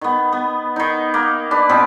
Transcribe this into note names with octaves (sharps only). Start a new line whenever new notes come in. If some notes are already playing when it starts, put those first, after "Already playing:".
D#3 B3
B3
D#3 D#4
A#3
D4 B4
B2 F3 C4